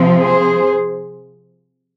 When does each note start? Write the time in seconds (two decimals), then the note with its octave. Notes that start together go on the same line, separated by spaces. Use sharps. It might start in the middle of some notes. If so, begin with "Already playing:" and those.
Already playing: C3 F3 C4
0.21 G#4 C5